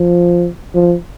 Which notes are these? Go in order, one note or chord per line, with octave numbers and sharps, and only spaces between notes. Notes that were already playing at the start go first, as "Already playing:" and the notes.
Already playing: F3
F3